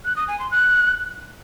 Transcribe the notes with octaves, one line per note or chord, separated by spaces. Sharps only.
F#6
D#6
G#5
C6
F#6